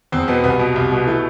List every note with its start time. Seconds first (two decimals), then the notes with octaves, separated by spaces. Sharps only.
0.12 E2 C4
0.28 B2 B3
0.44 C2 B3
0.59 B2
0.76 C2
0.92 B2
1.07 E3 A3